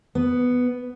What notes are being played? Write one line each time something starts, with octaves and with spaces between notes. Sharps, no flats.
B3